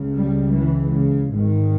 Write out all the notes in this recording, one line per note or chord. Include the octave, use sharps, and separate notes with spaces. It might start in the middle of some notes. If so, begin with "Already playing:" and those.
Already playing: C#2 C#3
G3
E3
C#3
G#1 G#2 D#3